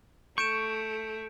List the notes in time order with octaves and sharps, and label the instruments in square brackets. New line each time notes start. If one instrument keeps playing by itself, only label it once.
[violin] A3 [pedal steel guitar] C#6 [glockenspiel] G6 D7 E7